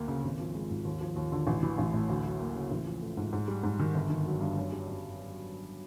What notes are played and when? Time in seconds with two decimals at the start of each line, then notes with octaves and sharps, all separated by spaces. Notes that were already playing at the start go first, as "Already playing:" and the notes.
Already playing: D2 A#3
0.08 C#3
0.24 G#1
0.40 F3
0.55 G#3
0.70 G#2
0.85 D#2
1.01 F3
1.16 D#2
1.32 D3
1.47 A1
1.63 E3
1.78 A1
1.93 A2
2.09 D2
2.25 F#3
2.40 A#3
2.55 C#3
2.71 A1
2.86 F3
3.02 A3
3.17 G#2
3.33 G#2
3.48 G3
3.63 G#2
3.79 D#3
3.94 G1
4.10 D#3
4.26 F#3
4.41 G2
4.57 F#2
4.72 G3
4.87 F#2